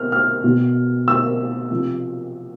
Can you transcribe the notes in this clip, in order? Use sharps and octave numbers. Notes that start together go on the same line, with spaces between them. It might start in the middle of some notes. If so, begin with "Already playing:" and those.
Already playing: B2 F6
F6
B2
E6
C3 F3